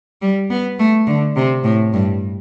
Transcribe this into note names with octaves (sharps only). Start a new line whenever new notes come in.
G3
B3
A3
D3
C3
A2
G2